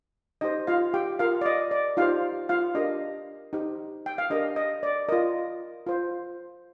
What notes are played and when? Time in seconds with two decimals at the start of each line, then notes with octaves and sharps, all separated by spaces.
0.41 D#4 G4 C5 D#5
0.67 F4 F5
0.94 G4 G5
1.19 F4 A#4 F5
1.41 D5
1.46 D#5
1.71 D5
1.97 D#4 F4 G4 C5 F5
2.49 F4 F5
2.75 D4 G4 A#4 D#5
3.53 D#4 G4 C5
4.06 G5
4.18 F5
4.30 D4 G4 A#4 D#5
4.56 D#5
4.83 D5
5.09 F4 A#4 D#5
5.87 F4 C5